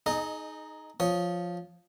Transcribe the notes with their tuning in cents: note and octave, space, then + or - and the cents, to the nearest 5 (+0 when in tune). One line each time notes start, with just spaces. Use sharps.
D#4 +0 G#4 +30 D#5 -20
F3 +5 C#5 +0 D#6 +0